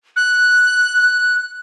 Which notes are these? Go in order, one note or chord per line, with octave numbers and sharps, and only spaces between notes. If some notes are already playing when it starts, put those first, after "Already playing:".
F#6